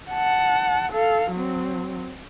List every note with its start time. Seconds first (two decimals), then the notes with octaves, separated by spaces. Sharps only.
0.12 F#5 A5
0.92 A4 F5
1.30 F#3 C4